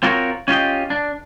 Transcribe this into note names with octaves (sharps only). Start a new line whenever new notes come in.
C4 F4 F#4 A#4 B4 C#5
C#4 F4 G4 D#5
D4